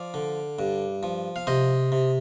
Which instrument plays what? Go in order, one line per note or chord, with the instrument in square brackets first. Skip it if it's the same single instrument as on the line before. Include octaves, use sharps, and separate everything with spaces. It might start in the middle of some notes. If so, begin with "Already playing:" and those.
Already playing: [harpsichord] F3 D5 F5
D3
G2
F3
F5
C3 C5 D#5
C3